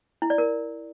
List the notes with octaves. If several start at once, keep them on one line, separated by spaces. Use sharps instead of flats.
E4
D5
A#4